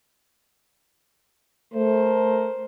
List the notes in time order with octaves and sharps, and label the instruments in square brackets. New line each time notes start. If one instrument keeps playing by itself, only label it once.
[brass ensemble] A3 A#4 [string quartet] C5